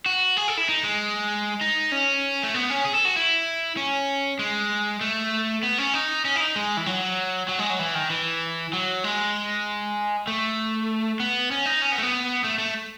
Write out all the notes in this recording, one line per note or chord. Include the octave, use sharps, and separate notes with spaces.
F#4
G#4
A4
E4
D#4
G#3
D#4
C#4
A3
B3
C#4
G#4
A4
F#4
E4
C#4
G#3
A3
B3
C#4
D#4
C#4
E4
D#4
G#3
E3
F#3
F#3
G#3
F#3
E3
D#3
E3
F#3
G#3
A3
B3
C#4
D#4
C#4
B3
A3
B3
A3
A3